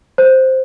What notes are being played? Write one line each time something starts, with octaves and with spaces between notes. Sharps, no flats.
C5